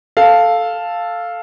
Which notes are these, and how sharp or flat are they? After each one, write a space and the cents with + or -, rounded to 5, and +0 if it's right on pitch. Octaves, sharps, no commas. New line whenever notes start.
A4 +0 F5 +0